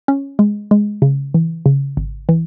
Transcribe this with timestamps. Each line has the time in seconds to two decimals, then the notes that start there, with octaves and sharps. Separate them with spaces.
0.08 C#4
0.39 G#3
0.71 G#3
1.02 C#3
1.34 E3
1.66 C#3
1.97 G#1
2.29 E3